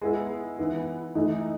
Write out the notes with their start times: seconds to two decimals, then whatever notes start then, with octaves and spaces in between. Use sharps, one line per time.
0.02 G#3 B3 E4
0.58 E3 B3 E4
1.15 E3 A3 D#4